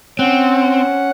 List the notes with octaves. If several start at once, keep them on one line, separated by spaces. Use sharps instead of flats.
C4 C#4 F#5